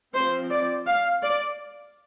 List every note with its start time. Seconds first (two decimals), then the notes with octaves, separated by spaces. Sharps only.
0.14 F3 C4 C5
0.50 D5
0.86 F5
1.23 D5